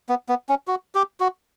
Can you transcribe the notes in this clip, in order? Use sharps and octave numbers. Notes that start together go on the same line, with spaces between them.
B3
B3
C#4
F#4
G4
F#4